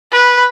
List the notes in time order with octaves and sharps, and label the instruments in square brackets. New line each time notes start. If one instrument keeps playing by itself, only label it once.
[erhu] B4